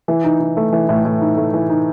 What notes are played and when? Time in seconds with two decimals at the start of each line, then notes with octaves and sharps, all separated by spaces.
0.08 E3
0.24 D#4
0.40 D#4
0.57 A3
0.72 E3
0.89 A2
1.05 A2
1.22 D#4
1.37 A3
1.54 E3
1.70 D#4